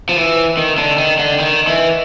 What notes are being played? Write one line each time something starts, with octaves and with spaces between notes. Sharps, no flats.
F3
E3
D#3
D3
D#3
D3
D#3
E3